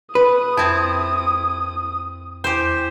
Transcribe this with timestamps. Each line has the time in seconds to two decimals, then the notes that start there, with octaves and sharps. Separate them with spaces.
0.15 B4 D#6
0.57 F2 C4 E4
2.44 E2 G4 C5